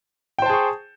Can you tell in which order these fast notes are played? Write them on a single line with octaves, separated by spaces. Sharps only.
G5 C5 A5 G#4 C#6